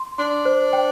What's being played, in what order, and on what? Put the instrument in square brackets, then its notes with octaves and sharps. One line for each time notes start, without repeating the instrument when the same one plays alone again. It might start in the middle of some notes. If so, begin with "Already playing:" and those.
Already playing: [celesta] C6
[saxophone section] D4 [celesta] C6
[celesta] C5
G5